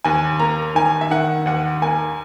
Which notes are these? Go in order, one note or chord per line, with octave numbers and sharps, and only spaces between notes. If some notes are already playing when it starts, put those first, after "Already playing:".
D#2 G#5
A#3 A#5
D#3 G#5
E5
D#3 F#5
D#2 F#5
A#3 G#5